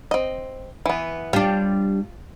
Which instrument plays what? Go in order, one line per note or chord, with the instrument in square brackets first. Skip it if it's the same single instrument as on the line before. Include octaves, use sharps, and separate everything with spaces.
[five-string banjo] C4 D#5
E3 B3
[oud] G3 D4 [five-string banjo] F4